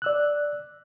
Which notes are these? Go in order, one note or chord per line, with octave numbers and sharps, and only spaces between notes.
D5 E6 F#6